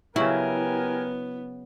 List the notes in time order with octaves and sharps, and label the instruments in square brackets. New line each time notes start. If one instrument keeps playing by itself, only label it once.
[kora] C#3 F#3 [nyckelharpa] B3 [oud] E4 [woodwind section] G4 A#4 G#5